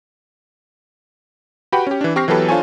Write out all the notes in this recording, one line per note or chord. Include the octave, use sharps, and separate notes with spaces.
F#4 G4 B4 F#5 G5 B5
C#4 G4
E3 D4
C4 G4 C#6 F6 A#6 C7
E3 F#3 B3 G4 A4 B4
D4 F4 A4 C5 C#5 G#5